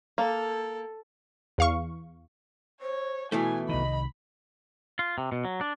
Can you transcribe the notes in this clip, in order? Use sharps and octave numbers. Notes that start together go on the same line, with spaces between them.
A#3 A4
E2 F5 C#6
C5 C#5
B2 E3 A3 E4 G#5
C2 D#3 D#5 B5
F4
C3
B2
F#3
D4